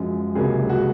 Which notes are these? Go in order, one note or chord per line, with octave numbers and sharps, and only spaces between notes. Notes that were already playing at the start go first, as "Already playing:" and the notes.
Already playing: F#2 F3 G#3 G#4
C#2 C3 F#3 A#3 G#4
F#4